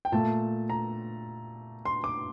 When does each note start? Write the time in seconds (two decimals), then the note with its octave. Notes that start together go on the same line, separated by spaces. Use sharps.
0.05 G5
0.12 A#2 A3 A5
0.70 A#5
1.85 C6
2.04 D6